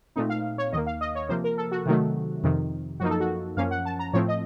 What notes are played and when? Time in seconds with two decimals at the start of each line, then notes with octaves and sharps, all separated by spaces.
0.16 A#2 A3 C4 D#4
0.30 F5
0.58 C#5
0.72 D#2 D#3 A#3 D#5
0.87 F5
1.01 D#5
1.15 C#5
1.29 C3 F3 A#3 C5
1.44 A#4
1.58 A4
1.72 F#4
1.86 C3 D#3 F#3 A3
2.43 F2 C3 D#3
3.00 F#2 F3 A#3 D#4 F#4
3.10 A4
3.20 F#4
3.57 F#2 F3 A#3 C#4 F5
3.71 F#5
3.85 A5
3.99 A#5
4.13 A2 F3 A3 C4 C#5
4.28 D#5